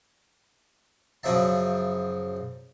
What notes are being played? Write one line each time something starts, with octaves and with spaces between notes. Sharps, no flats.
F#2 C#3 F3 E5 A5